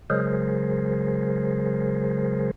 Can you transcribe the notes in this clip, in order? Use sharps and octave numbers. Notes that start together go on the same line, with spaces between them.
C#3 F#3 G#3 G#4 A#4 C5